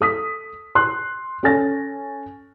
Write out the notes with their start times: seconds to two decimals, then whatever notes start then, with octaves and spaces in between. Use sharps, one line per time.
0.01 A4 D#6 B6
0.75 C6 F#6
1.43 C#4 A4 G#5 A6 A#6